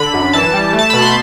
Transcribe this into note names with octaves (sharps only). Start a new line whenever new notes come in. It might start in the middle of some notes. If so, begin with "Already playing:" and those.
Already playing: D3 B5
F#2
E3 A5
G3
A3
A5
B2 B5
C6